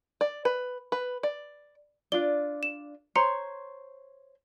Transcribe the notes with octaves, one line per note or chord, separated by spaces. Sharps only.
D5
B4
B4
D5
D4 F4 D5 G7
E7
C5 C#5 A#5 C6 C#7